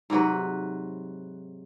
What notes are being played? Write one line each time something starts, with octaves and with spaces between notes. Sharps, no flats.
G#2 C3 F#3 B4